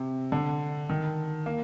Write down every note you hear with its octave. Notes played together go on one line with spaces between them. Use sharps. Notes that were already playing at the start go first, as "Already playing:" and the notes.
Already playing: C3
D3
D#3
A#3